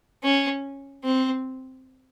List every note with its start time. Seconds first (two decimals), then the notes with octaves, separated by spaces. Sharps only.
0.23 C#4
1.04 C4